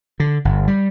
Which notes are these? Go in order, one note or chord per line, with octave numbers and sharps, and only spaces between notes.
D3
G1
G3